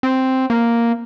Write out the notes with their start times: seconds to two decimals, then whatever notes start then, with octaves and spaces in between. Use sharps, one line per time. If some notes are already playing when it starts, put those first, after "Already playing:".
0.03 C4
0.50 A#3